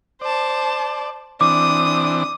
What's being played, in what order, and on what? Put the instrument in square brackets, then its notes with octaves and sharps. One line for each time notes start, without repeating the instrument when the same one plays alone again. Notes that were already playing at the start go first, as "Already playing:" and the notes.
[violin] C5 A5 [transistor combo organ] D5
[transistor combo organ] E3 C4 D4 [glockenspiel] D6 [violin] D#6